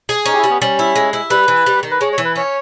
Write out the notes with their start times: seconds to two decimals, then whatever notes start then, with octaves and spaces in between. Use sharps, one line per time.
0.09 G#4
0.26 C#4 D#4
0.34 G4
0.38 E4
0.43 G3
0.50 B3
0.61 G3 C#4
0.79 E4
0.96 G#3
1.13 E4
1.30 G3 B4
1.48 E3
1.66 G3
1.83 D#3
1.91 B4
2.01 G#3 C#5
2.12 C#5
2.18 E3
2.25 B4
2.36 C#4 C#5